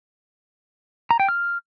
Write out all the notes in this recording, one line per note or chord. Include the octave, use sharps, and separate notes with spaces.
A#5
G5
F6